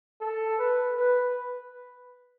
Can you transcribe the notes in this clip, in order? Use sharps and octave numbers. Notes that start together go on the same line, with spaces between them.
A4
B4
B4